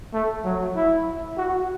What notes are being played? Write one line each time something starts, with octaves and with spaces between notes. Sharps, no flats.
A3
F#3
E4
F#4